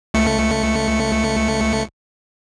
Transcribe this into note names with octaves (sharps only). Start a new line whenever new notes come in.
C#2 A3 C#7